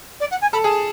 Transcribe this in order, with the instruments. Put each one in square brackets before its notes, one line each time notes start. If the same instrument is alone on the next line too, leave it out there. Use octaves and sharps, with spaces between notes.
[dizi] D5
F#5
G#5
[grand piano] A4 [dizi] B5
[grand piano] G#4 [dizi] A5